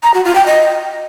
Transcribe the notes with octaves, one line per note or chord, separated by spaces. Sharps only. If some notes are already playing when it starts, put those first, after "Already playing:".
A#5
F#4
F4
G5
D#5